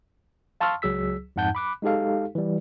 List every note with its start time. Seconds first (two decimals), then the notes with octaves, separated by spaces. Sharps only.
0.61 F5 A5 C6 C#6 E6 F6
0.82 C#2 F#3 G#4 E6 B6
1.36 F2 G#2 D#4 F#5 A5 G6
1.55 B5 D6 F#6
1.82 G#3 D#4 G4 A4 F5
2.35 E3 G3